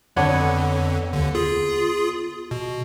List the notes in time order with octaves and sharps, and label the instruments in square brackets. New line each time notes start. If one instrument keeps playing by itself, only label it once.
[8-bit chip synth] F2 D3 [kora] B3 D4 C#5
[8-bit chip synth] D#2 D3
F4 G#4
B2